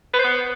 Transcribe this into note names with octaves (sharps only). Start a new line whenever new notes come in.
B4
C5
B3